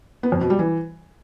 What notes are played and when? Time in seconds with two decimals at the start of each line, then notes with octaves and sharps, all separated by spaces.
0.23 B3
0.32 F2
0.41 B2
0.50 G3
0.59 E3